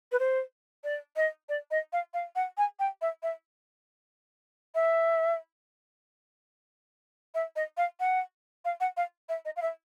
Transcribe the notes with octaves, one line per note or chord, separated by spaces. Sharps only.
B4
C5
D5
D#5
D5
D#5
F5
F5
F#5
G#5
G5
E5
E5
E5
E5
D#5
F5
F#5
F5
F#5
F5
E5
D#5
F5
E5